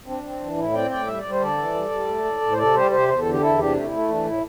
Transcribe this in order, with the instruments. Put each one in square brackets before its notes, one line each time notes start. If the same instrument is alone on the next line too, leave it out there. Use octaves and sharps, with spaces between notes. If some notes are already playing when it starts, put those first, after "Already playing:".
[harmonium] C4 D4
C4
E3
A2 E4
C4 D5 G5
A2 D5 G5
G3 E5
D5
G3
C5
D3 A4 D5
E3
G3
G3
A3
A2
A2
C5
C3 A4 D5
G3 G4 C5
C3 G4 C5
E2 C5
A4
D3
G4
E2 E4 A4
C3 D4 G4
A3 G4
E4
A3
E3 D4
A2 E4